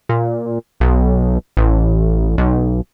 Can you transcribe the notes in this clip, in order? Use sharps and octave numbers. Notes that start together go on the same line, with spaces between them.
A#2
B1
A1
B1